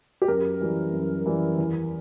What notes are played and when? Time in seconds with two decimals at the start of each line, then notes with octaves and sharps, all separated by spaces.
0.22 G4
0.28 F#2 A#4
0.61 E3 G3
0.93 F#2
1.26 E3 G3
1.58 E2